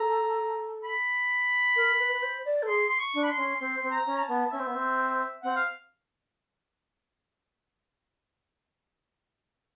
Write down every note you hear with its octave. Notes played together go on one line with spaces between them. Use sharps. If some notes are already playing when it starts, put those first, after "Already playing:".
Already playing: A4 A#5
B5
A#4
B4
B4
C5
D5
A4
G#4 C6
C6
C#6
D4
B5
C6
C#4
C4 C6
C4
A#5
C#4
A#5
A5
B3
C#4 E5
C4
B3
C4
C4 F#5
F5